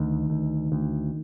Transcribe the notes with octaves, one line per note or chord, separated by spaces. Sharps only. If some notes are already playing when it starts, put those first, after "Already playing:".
Already playing: D2 D#3
D2
D2